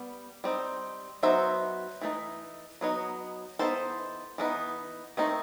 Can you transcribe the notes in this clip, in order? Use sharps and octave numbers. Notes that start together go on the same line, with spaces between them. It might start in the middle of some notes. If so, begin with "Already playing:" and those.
Already playing: G3 B3
G3 C4 D#4
F#3 B3 D#4 C5 E5
E3 A3 D#4
F#3 B3 D#4
E3 B3 D#4 A4 C5
E3 B3 D#4
D#3 A3 C4 D#4